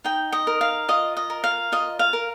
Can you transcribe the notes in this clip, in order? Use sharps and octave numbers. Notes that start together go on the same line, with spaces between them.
D#4 G5
D#5
A#4
F5
F4 D#5
D#5
A#4
F5
F4 D#5
F5
A#4